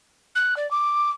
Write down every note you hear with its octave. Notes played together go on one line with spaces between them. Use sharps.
F#6
D5
D6